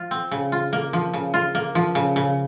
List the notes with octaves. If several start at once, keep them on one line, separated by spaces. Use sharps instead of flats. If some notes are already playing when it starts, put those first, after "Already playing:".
Already playing: F3 F4
C4
C#3
F4
A#3
F3
C#3
F4
A#3
F3
C#3
C#3